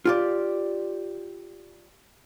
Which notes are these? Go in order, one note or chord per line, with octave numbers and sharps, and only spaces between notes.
F4 G4 D5